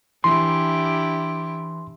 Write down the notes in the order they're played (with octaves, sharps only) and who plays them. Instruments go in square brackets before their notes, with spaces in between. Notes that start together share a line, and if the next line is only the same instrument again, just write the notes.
[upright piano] E3 [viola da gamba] D4 E4 G4 [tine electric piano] C6